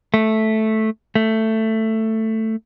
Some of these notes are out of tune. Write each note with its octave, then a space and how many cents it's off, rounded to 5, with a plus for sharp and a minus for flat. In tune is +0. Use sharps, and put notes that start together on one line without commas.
A3 -5
A3 +10